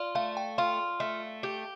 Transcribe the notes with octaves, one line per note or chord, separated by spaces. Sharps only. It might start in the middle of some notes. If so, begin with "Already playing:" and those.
Already playing: F4 D5
A3 F5
G5
F4 F5
A3
G4